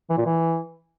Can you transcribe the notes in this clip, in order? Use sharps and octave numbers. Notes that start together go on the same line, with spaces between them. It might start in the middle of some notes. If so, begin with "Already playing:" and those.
E3
A#2
E3